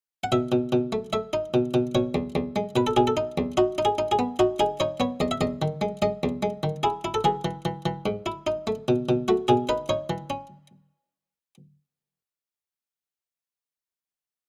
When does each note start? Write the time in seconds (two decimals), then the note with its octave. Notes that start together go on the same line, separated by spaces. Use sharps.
0.24 F#5
0.32 B2 E5
0.52 B2
0.72 B2
0.92 A3
1.13 A3 E5
1.33 D#4
1.54 B2
1.74 B2
1.95 B2 C#5
2.15 E2
2.35 E2
2.56 G#3
2.76 B2 B4
2.87 A4
2.97 B2 G#4
3.07 A4
3.17 D#4
3.38 E2
3.57 D#4 F#4
3.78 D#4
3.85 G#4
3.98 D#4
4.12 G#4
4.19 B3
4.39 D#4 F#4
4.60 D#4 G#4
4.80 D#4 C#5
5.00 B3 C#5
5.20 E2 D#5
5.31 E5
5.41 E2 D#5
5.62 D#3
5.81 G#3
6.02 G#3 D#5
6.23 E2
6.43 G#3
6.63 D#3
6.83 E4 G#4
7.05 E4
7.14 A4
7.24 E3 G#4
7.45 E3
7.65 E3
7.86 E3
8.06 G#2
8.26 E4
8.47 D#4
8.67 A3
8.88 B2
9.09 B2
9.28 A3 F#4
9.48 B2 G#4
9.69 D#4 B4
9.89 D#4 C#5
10.10 E3
10.30 C#4